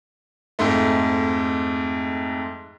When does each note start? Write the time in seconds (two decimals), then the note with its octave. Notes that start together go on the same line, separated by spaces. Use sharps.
0.59 F2 G#2 A3